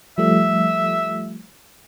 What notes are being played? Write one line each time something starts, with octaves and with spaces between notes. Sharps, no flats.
F3 G3 A3 E5